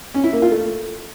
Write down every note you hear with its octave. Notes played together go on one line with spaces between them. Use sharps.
C#4
E4
A#3
F4
A3